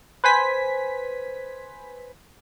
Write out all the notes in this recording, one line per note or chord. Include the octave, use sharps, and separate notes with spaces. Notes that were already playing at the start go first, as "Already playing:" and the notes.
B4 C5 G#5 B6